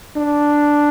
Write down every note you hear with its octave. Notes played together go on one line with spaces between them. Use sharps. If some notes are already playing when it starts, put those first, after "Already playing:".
D4